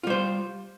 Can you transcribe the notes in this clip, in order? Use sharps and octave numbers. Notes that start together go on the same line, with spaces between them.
G3 F4 C5